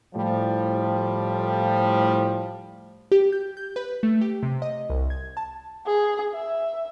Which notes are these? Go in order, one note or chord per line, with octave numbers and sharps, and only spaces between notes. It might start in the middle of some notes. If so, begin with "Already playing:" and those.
A2 F3 G3
G4
G6
G6
B4
A3
G4
C3
D#5
C2
G#6
A5
G#4
E5